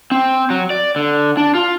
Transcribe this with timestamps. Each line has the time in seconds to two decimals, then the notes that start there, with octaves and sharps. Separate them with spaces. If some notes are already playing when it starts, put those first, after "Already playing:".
0.11 C4
0.50 F#3
0.70 D5
0.96 D3
1.37 D4
1.55 F4